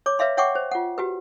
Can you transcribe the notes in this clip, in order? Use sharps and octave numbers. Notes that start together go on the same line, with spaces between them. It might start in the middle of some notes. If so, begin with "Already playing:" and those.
C#5 D6
B4 C#5 E5 F5 C6
C#5 E5 F#5 G5 C#6 D6
C5
F4 F#5
F#4 G4 B4